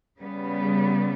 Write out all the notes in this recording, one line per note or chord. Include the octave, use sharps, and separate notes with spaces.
C#3 G3 B3